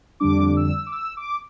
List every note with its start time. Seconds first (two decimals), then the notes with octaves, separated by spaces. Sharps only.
0.20 F2 D3 G3 D4 D6
0.57 E6
0.87 D6
0.92 E6
1.17 D6